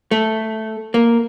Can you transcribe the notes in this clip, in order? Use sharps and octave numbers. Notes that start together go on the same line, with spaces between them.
A3
A#3